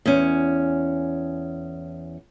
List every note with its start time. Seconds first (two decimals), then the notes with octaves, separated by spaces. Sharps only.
0.06 E2 C#4